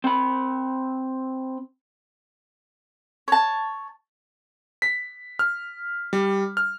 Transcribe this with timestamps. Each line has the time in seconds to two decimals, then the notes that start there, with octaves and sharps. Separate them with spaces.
0.04 C4 B5
3.28 C#5 A5
4.82 B6
5.39 F6
6.13 G3
6.57 F6